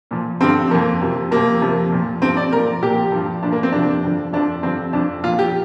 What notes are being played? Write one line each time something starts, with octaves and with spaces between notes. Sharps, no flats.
A#2 F3
G2 D3 F3 C4
F2 F3 A#3
F2 C3 F3
F2 C3 F3 A#3
F2 C3 F3
A#2 F3
G2 F3 C4
D5
A#2 F3 A#4
A#2 F3 G4
G2 F3
A#2 F3 D4
A#3
C4
F2 C3 F3 D4
G2 D3 F3
F2 F3 D4
G2 D3 F3 C4
F2 F3 D4
A#2 F3 F4
G4